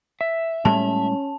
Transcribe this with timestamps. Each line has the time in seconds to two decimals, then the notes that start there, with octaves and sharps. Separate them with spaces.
0.21 E5
0.65 A2 G3 G#3 C#4 A5